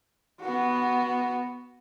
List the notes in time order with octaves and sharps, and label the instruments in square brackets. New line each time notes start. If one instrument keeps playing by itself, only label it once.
[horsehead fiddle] B3 F#4